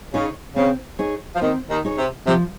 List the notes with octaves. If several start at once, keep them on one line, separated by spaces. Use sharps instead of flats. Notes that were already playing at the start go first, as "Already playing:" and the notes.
C#3 D#4 G#4 C#5
C#3 C4
D#4 G#4 C#5
F3
D#2 D#3 C4
D#2 D#3
D#4 G#4 C#5
C3
C3 F3